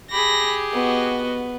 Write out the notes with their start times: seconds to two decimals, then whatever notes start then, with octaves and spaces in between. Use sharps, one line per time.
0.11 G4 G#4 B5 A#6
0.73 B3 F#4 D#5